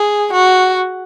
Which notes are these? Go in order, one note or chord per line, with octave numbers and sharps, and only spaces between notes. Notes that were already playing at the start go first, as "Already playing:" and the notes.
Already playing: G#4
F#4